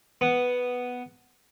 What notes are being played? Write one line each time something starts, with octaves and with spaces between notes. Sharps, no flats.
B3